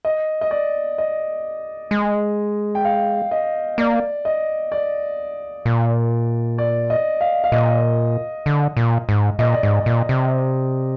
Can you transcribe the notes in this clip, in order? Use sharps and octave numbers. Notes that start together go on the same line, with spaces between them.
D#5
D#5
D5
D#5
G#3
G5
F5
D#5
A#3 D5
D#5
D5
A#2
D5
D#5
F5
F5
A#2 D#5
D3
A#2
G#2
A#2 D#5
D5
G#2
D5
A#2
C3